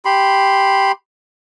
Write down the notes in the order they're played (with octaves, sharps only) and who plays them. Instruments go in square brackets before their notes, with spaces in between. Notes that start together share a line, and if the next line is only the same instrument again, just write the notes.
[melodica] G4 B5 C6